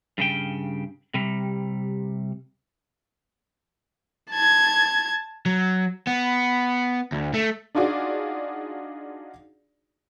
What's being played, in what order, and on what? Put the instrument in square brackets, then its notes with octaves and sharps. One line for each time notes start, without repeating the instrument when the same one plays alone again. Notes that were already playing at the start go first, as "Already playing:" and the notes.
[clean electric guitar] G2 C#3 G5
C3 G3
[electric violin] A5 G#6
[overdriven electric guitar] F#3
B3
D2
A3
[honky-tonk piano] D4 D#4 F4 F#4 G#4 D5